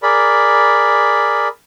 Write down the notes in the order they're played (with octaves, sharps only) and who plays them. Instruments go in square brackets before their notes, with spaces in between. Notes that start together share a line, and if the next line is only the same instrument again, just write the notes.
[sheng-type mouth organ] G#4 A#4 D5 B5